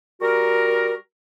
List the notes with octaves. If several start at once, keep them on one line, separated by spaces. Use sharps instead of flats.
G3 F#4 A#4